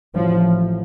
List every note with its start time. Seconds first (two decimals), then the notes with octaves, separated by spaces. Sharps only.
0.15 A1 A2 F3 F#3